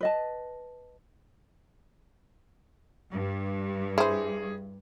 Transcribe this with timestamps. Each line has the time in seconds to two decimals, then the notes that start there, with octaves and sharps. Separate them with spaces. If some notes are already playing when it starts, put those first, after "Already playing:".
0.01 B4 D#5 A5
3.12 G2
3.98 E4 G#4 C5